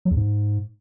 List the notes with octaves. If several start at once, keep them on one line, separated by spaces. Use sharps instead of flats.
F#3
E2
G#2